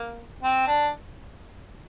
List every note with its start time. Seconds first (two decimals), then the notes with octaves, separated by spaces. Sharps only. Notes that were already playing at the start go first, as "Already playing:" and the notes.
Already playing: A#3
0.43 C4
0.67 D4